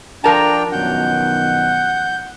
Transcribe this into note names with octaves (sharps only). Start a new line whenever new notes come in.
F3 D4 A#4 G5 A5 A#5
F#2 B2 D#3 F#5 G6